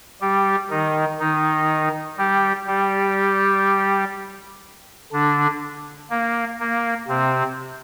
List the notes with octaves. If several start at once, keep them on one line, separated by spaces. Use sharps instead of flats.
G3 G4
D#3 D#4
D#3 D#4
G3 G4
G3 G4
D3 D4
A#3
A#3
C3 C4